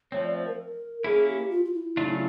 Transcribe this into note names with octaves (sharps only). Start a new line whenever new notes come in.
F3 A3 C4 C#5
D5
C5
A#4
A#3 C#4 E4 G#4
G4
F4
F4
E4
C#3 F#3 A3 D4 D#4 F4
E4